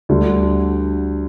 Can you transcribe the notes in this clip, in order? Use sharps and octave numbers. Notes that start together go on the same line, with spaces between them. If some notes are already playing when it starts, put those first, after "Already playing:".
D2 D3 G3